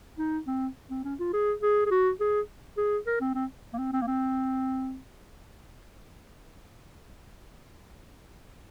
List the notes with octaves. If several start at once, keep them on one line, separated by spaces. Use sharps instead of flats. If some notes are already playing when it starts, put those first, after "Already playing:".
D#4
C4
C4
C#4
F4
G#4
G#4
G#4
F#4
G#4
G#4
A#4
C4
C4
A#3
C4
C4
A#3
C4